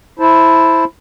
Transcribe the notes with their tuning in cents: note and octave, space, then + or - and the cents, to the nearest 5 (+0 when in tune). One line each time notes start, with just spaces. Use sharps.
E4 +0 C5 +0 A5 +0